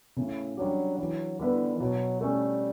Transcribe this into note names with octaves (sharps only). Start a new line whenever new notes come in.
A2 C#3
F#3 G3 D4 G4
E3 F#3
D3 G3 B3 E4 B4
B2 F#3
G3 A3 C#4